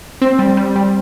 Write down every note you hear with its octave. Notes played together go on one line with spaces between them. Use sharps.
C4
G3
G3
G3